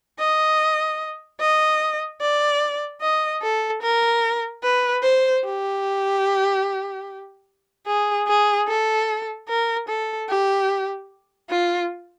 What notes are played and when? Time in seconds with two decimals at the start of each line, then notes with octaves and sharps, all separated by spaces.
0.19 D#5
1.40 D#5
2.21 D5
3.02 D#5
3.42 A4
3.82 A#4
4.63 B4
5.03 C5
5.45 G4
7.87 G#4
8.28 G#4
8.68 A4
9.49 A#4
9.88 A4
10.29 G4
11.50 F4